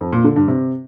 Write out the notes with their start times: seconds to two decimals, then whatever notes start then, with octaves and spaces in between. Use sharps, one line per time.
0.01 F2
0.13 A#2
0.24 D3
0.36 G2
0.48 C3